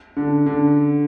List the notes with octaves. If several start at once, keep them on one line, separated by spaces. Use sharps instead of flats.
D3
D3